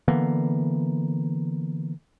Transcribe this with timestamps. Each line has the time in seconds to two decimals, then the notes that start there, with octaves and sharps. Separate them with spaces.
0.08 D3 E3 A#3 B3